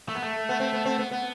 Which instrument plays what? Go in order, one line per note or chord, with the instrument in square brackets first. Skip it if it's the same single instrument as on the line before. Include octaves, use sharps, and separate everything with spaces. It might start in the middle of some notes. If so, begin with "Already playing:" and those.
[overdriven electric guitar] A3
B3
A3
[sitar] B3
C4
B3
C4
B3
B3